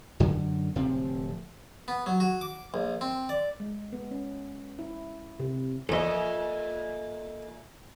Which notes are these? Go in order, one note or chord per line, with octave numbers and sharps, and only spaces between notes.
F#2 D3
D1 C3 F3 C4
B3
F#3
F#4
D6
A#1
C4
D5
G#3
B3
C#4
E4
C3
E2 A#2 F3 A4 D#5 E5